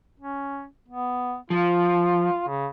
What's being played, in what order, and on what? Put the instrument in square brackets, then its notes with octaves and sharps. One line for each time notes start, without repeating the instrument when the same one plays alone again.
[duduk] C#4
B3
[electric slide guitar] F3 [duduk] F4
[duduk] C#3